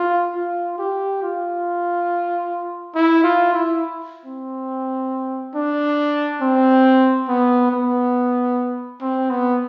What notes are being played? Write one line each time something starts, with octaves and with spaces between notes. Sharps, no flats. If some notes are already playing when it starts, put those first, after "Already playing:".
Already playing: F4
F4
G4
F4
E4
F4
E4
C4
D4
C4
B3
B3
C4
B3